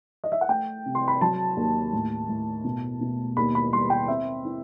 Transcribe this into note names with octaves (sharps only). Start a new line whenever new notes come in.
D#5
E5
F#5
A3 G5
C3
C6
B5
F#3 A5
D#2
A2
A2
B2
B2
D#2 B5
B5
G3 C6
G5
C4 E5
E4